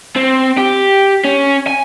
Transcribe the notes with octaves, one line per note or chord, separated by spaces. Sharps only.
C4
G4
C#4
G#5